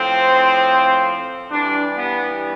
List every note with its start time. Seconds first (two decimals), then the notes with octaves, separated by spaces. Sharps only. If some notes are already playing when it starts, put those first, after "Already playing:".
Already playing: A2 F3 C4
1.52 G2 E3 G3 D4
1.96 B3